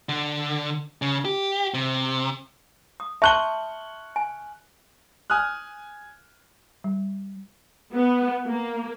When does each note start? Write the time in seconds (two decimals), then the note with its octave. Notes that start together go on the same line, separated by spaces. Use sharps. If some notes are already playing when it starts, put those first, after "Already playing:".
0.09 D3
1.02 C#3
1.25 G4
1.74 C3
3.00 D#6
3.22 E5 A5 C6 C#6 F#6 G7
4.16 G#5
5.30 G#5 D#6 F6 F#6
6.84 G3
7.94 B3
8.46 A#3